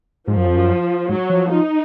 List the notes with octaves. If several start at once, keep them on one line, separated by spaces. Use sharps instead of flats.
G#2 F3
F#2
F2
F#2
G#2 F#3
F3
D#4